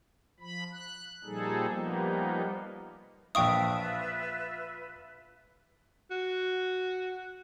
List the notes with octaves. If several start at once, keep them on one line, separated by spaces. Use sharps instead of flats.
F3 B5
F#6
A#2 F3 G3 D#4 G#4 A4
F3 G3 A#3 B3 D#4
A#1 F4 B4 E5 F5 G5 C#6 D#6
F#4